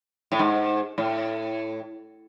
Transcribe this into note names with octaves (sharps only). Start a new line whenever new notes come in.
A2
G#2
A2